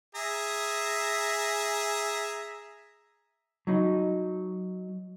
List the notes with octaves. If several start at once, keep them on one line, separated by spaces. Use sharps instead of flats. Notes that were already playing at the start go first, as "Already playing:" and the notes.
G#4 E5 A#5
F#3 D#4